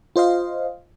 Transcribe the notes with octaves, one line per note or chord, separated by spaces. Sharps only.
F4 C5 D#5 F5